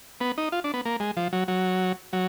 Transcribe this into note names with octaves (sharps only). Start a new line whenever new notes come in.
B3
D#4
F4
D4
B3
A#3
G#3
F3
F#3
F#3
F#3